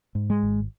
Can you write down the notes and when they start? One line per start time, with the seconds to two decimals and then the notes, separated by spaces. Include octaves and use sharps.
0.15 G#2
0.30 G#3
0.43 G#1